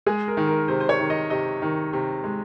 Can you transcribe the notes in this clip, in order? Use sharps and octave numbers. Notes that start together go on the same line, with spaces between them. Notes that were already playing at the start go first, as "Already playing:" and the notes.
G#3 G#4
A#4
D#3
A#4
C3 C5
C5
C#5
D#3
D#5
C3 D#5
D#3
C3
G#3